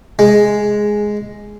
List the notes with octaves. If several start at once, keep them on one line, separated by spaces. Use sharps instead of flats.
G#3